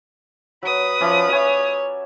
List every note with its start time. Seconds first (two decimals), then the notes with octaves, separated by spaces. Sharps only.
0.63 F#3 B4 D#6
1.01 F3 C#4 D5 E5
1.32 C#5 E5 G#5